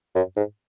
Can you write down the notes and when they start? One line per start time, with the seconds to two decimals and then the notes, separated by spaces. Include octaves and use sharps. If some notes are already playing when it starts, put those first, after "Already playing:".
0.15 F#2
0.36 G#2